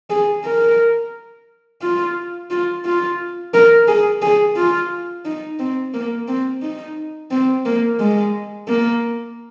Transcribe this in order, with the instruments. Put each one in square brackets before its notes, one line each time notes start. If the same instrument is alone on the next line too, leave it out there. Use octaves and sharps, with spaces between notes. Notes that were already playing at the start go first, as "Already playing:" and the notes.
[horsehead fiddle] G#4
A#4
F4
F4
F4
A#4
G#4
G#4
F4
D#4
C4
A#3
C4
D#4
C4
A#3
G#3
A#3